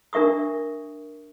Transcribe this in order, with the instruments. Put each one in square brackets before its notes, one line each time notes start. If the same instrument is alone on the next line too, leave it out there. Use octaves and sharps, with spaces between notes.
[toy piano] D4 A#4 E5 C#6 D#6